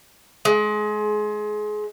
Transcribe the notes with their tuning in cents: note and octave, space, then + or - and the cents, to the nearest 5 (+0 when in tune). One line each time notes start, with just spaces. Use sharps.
G#3 +25